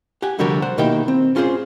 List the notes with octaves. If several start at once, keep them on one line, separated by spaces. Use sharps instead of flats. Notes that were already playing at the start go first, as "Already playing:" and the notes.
G4 F#5 G#5
C2 D3 F3 G3 F#4 A#4
C5 F#5
B2 D#3 A#3 E4 G4 A#4
C4
B3 C#4 F4 F#4 G#4 C5